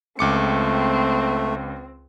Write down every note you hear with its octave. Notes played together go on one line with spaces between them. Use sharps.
C#2 A3 C4 D6 C#7